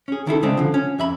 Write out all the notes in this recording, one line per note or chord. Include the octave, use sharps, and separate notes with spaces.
C#4 G#4
D#3 E4 G#4 A4
C#3 G#3 C4 D4
D3 F3
C#4
F2 E5 B5